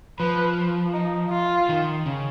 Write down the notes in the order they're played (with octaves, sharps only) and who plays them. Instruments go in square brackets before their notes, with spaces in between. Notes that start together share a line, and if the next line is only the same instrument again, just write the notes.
[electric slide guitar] F3 [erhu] B4
[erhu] D#4
F4
[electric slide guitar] D#3
C#3